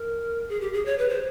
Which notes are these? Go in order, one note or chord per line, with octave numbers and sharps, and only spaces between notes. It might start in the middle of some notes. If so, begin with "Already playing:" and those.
Already playing: A#4
G#4
G4
G#4
C#5
B4
C5